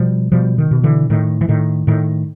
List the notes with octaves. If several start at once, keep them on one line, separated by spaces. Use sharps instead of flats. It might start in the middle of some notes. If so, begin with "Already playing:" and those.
Already playing: B2 F3 G3
B2 F3 G3
D#3
B2
D3 E3
A2 D#3
E3
A2 D#3
A2 D#3